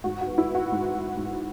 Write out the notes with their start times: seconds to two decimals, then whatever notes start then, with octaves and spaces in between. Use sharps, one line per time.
0.04 G#2 F#4
0.21 F#4
0.26 B3
0.38 E4
0.49 B3
0.55 F#4
0.72 G#2
0.94 G#2
1.16 G#2